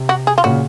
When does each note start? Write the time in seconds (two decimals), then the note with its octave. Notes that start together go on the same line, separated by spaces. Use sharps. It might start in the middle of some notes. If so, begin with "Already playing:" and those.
Already playing: C3
0.09 F#4
0.27 G#4
0.38 F4
0.44 A#2 C#3 F#4